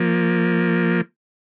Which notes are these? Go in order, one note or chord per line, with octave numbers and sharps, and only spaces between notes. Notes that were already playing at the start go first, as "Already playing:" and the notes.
Already playing: F3 A#3